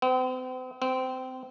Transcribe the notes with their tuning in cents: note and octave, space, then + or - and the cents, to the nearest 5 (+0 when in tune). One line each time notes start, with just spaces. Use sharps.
C4 -40
C4 -20